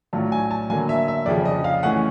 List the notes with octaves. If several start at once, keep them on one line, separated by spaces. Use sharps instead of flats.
A2 F#3 A3 D4 F4 A5
G#5
A5
D3 F#3 A#3 G#5
E5
E5
F2 C#3 F3 D5
D#5
F5
E3 A3 C#4 F#5